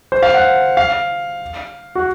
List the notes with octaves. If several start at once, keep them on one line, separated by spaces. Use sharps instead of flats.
C5
F5
F#5
F5
F#4